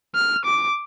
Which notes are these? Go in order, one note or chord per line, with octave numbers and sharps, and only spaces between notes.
F6
D6